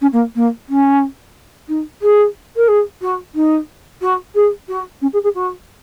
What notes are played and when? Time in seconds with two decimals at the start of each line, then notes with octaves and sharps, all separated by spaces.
0.01 C#4
0.13 A#3
0.35 A#3
0.69 C#4
1.69 D#4
2.02 G#4
2.57 A#4
2.68 G#4
3.02 F#4
3.35 D#4
4.02 F#4
4.35 G#4
4.69 F#4
5.02 C#4
5.13 G#4
5.24 G#4
5.35 F#4